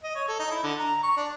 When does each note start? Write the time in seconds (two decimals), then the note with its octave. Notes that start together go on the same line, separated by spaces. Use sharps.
0.03 D#5
0.15 C#5
0.28 A4
0.39 D#4
0.51 E4
0.63 D3
0.79 A#5
1.03 C#6
1.17 D4